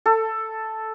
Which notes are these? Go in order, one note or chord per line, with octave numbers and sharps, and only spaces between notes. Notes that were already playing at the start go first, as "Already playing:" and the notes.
A4